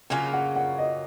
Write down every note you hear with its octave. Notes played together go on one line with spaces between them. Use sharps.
C#3 F#3 A#3 F4 G#5
F#5
F#5
D#5